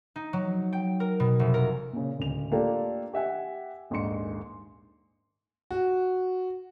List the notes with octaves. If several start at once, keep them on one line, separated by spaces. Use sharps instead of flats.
D#4
F#3
G5
A#4
B2
F1
A#4
A#2 C#3
D1 C#2 F7
A3 A#3 D4 F4 G4 A4
G4 E5 F#5 G#5
D#1 A#1 G#2 D#3 C6 C#7
F#4